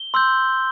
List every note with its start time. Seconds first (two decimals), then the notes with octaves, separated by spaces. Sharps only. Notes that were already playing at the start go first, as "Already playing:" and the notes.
Already playing: G7
0.14 C6 E6 G6